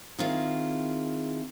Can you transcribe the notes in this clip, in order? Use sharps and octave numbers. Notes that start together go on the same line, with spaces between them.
D#3 C4 E4 F4 G#4